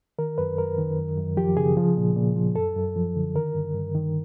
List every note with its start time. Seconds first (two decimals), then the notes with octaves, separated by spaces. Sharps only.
0.18 D#3 A#4
0.38 F#2 B4
0.58 F#2 A#4
0.78 D#3
0.98 F#2
1.17 F#2
1.37 F3 G4
1.57 C#3 G#4
1.77 F3
1.97 A#2
2.16 A#2
2.36 F3
2.56 F#2 A4
2.76 F#2
2.96 F3
3.16 D3
3.36 D#3 A#4
3.55 G2
3.74 G2
3.95 D#3